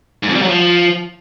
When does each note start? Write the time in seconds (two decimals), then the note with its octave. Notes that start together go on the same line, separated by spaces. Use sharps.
0.23 G#2
0.29 F2
0.36 G3
0.42 F#3
0.48 F3